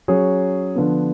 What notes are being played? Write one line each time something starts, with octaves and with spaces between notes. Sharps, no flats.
F#3 C#4 G#4 C#5
D3 F3 B3